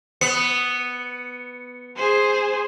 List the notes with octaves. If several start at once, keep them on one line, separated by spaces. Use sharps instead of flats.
B3 C#7
G#4 C5